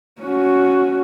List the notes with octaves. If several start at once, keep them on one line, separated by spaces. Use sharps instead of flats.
C#4 F#4